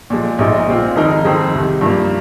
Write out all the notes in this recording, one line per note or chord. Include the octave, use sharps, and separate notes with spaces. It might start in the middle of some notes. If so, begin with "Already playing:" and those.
A#2 F3 G#3
A#1 A#2 G#3 D#4
A#2 G#3 C4 F4
F2 D#3 G#3 D#4 A#4
F2 D#3 G#3 C4
C2 C3 D#3
G2 F3 A#3